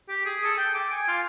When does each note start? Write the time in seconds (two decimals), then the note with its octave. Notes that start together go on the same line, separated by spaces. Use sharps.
0.09 G4
0.26 G#4
0.44 A4
0.57 G5
0.75 D6
0.92 G#5
1.08 F4